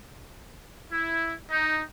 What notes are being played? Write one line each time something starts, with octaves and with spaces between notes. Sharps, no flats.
E4
D#4